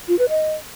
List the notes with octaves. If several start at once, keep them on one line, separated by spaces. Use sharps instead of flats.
F4
B4
D#5